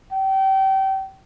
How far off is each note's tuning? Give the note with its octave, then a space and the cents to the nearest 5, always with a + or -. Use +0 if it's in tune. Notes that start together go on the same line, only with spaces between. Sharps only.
G5 -30